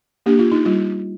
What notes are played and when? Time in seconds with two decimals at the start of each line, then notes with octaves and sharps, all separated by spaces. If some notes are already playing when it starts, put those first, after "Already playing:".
0.26 A#3 D4 G4
0.39 F4
0.52 D#4
0.65 G3 F4